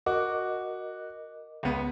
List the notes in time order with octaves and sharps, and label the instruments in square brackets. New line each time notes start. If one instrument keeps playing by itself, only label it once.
[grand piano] F#4 [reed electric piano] A#4 D#5 D6
[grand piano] C#2 B3